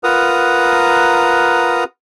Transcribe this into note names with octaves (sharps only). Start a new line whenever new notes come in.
F4 A#4 B4 F#5 A#5 D#6